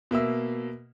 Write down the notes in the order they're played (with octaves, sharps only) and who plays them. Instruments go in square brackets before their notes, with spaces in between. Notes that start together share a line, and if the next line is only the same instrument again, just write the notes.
[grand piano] B2 A#3 E5 E6